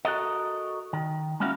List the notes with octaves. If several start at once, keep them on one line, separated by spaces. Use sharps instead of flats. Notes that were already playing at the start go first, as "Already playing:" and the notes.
F#4 A4 A#4 D#5
D#3
G#3 A#3 C#4 E4 F#4 F5